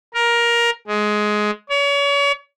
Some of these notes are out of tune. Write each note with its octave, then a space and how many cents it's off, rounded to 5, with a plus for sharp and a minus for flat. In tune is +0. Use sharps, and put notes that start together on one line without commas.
A#4 +15
G#3 +15
C#5 +35